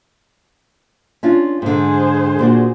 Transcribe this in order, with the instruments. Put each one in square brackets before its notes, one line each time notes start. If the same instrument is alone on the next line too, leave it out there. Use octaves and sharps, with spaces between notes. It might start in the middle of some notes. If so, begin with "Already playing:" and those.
[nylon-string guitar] C#4 D4 F4
[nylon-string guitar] G#2 D3 [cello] G#4 C5
[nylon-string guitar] A#2 D4 F#4